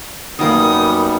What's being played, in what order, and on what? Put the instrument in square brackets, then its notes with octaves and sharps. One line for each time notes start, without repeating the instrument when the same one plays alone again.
[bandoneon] F#2 G3 B3 [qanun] D#3 A#3 [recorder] D#6